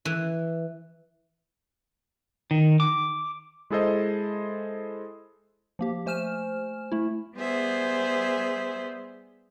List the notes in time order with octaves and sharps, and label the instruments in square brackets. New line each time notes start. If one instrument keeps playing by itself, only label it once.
[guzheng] E3
[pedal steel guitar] D#3
D6
[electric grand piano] G#3 E4 G#4 A4 C5 D#5
[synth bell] F3 A#3 G4
A3 C5 G#5 F6 E7
A3 E4
[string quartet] G3 B3 G#4 C5 E5